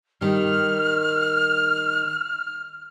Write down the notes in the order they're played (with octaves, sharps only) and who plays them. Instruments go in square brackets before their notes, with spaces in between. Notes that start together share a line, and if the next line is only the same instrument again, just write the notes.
[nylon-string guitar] D#3 G3 [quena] F6